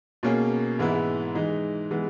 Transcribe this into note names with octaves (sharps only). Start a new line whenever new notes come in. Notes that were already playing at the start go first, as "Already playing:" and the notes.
B2 A#3 C#4 G#4
G#2 E3 G#3 B3 E4
E3 G#3 D#4
E3 G#3 B3